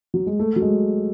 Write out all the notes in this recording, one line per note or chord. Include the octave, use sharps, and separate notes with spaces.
F#3
G#3
A3
F#3
G#3